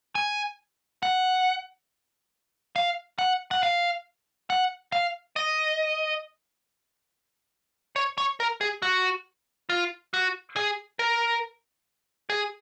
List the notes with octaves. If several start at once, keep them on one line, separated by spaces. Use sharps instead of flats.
G#5
F#5
F5
F#5
F#5
F5
F#5
F5
D#5
C#5
C#5
A#4
G#4
F#4
F4
F#4
G#4
A#4
G#4